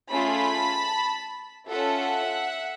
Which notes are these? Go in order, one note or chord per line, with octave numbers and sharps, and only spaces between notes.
A3 C#4 F4 G#4 A5 B5
C#4 F4 A4 E5 F#5